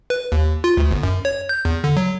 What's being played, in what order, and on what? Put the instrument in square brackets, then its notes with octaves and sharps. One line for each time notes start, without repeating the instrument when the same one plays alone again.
[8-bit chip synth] B4
D#2
F4
D2
G1
F#2
C#5
G6
E2
D3
F#3